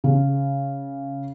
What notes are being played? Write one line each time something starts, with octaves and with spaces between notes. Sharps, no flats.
C#3